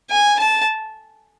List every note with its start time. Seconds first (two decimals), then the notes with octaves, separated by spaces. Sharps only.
0.10 G#5
0.39 A5